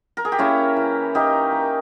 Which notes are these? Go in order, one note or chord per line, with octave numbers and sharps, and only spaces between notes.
A#4
G#4
G4
A#3 C#4 E4
E3
A#3 D#4 G4
A#3